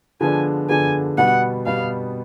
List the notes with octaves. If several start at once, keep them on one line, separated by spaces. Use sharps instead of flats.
D3 F3 G#3 B3 D4 G#5
D3 F3 G#3 B3 D4 G#5
B2 G3 B3 F#5
B2 G3 B3 F5